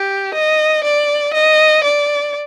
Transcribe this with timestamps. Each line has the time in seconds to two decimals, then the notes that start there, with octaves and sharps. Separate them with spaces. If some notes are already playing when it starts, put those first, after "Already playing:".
Already playing: G4
0.34 D#5
0.84 D5
1.34 D#5
1.83 D5